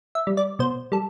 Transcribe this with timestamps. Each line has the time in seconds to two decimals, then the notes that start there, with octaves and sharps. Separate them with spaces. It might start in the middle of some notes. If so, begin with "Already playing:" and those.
0.15 E5
0.27 G3
0.37 D5
0.59 B2 C5
0.92 G3 A4